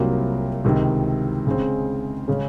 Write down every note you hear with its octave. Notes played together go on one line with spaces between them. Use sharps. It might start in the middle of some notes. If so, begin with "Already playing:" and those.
Already playing: C2 C3 F#3 A#3 F4
C#2 C3 D#3
C#3 G#3 C4
C#3 G#3 C#4